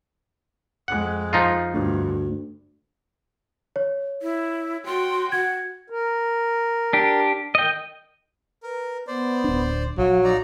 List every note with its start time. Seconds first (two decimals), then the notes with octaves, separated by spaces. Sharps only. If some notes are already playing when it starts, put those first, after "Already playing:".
0.88 F2 G#3 F#5
1.33 F3 D#4 F4
1.73 D2 G2
3.76 C#5
4.22 E4
4.85 F#4 G5 C6
5.32 F#5 G#6
5.90 A#4
6.93 D4 G4
7.55 D#3 D#5 G5
8.62 A#4 B4
9.07 B3 C5 D5
9.44 D1 D4
9.98 A#1 F#3 F5
10.24 D#4 D5 A#5